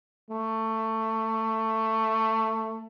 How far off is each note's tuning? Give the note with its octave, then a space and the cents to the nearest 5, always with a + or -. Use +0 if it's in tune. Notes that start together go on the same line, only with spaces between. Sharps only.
A3 +15